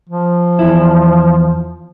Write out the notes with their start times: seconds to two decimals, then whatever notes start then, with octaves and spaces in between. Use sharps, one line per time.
0.09 F3
0.59 E2 E4